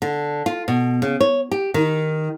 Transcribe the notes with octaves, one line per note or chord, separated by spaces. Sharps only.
D3
F4
B2
C#3
C#5
G4
D#3